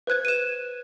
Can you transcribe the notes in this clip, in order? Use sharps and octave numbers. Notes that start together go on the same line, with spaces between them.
B4 C5 F#6 G#6
D#7 E7